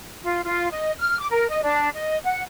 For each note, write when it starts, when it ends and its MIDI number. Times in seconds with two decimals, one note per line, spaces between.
0.24 0.41 65
0.45 0.71 65
0.71 0.92 75
0.98 1.19 89
1.19 1.26 86
1.31 1.46 70
1.49 1.63 75
1.63 1.89 62
1.94 2.17 75
2.24 2.41 78